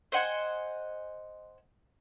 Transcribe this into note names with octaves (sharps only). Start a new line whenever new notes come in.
C5 D#5 F#5 G#5